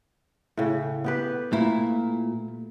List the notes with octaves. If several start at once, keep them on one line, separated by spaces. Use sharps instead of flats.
A2 C#3
B3 G4 B4
A#2 A3 E4